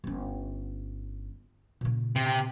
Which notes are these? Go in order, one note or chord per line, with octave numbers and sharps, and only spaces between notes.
G1 C#4
A#2 C#3
C3